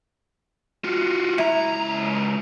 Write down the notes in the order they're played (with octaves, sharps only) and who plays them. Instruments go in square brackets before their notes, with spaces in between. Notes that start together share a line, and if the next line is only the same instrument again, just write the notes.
[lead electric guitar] F4 F#4
[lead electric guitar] C#2 A#5 [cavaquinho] E4